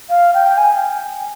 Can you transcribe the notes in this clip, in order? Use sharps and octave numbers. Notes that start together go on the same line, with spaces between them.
F5
G5
G#5